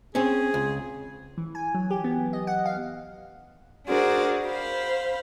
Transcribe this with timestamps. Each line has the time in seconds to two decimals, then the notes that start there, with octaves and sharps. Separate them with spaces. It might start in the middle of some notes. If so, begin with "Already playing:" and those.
0.15 C4 C#4 G#4
0.54 C#2
1.38 E3
1.55 G#5
1.74 F#3
1.90 G4
2.04 B3
2.33 D#5
2.47 F#5
2.65 F5
3.87 D4 F#4 G#4 A#4 C5 D5
4.45 C5 F5 B5